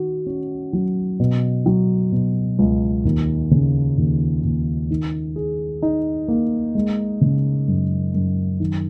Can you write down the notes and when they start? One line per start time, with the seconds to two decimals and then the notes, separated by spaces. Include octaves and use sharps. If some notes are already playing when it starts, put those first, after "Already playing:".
Already playing: D#3 F#4
0.27 C#4
0.73 F#3
1.20 B2
1.66 F#3
2.12 B2
2.59 C#2
3.05 D#2
3.51 C#3
3.98 D#2
4.44 D#2
4.91 D#3
5.36 G#4
5.82 D#4
6.28 A#3
6.75 G#3
7.21 C#3
7.68 F#2
8.14 F#2
8.60 D#3